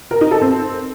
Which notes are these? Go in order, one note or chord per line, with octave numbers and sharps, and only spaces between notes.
A#4
D#4
A4
C4